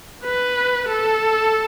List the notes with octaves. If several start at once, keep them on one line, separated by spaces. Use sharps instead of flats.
B4
A4